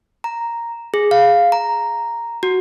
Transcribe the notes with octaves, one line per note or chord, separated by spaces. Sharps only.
A#5
G#4
F5
A#5
F#4